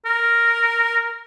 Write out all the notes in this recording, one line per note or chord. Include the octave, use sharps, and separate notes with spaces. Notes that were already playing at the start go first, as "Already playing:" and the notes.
A#4